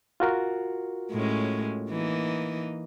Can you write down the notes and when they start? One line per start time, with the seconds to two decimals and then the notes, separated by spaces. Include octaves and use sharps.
0.20 F4 F#4 A#4
1.11 A2 G#3 C#4
1.90 E3 A#3 D#4